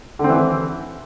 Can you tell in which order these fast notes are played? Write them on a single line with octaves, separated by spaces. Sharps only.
D3 C4 E3